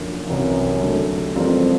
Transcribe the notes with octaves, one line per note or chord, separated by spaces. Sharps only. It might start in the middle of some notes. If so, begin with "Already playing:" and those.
Already playing: F#2 D3 F3 A#3
C2 F#2 C3 E3
D3 F#3 A3
F2 E3 G3 C4 F4 A#4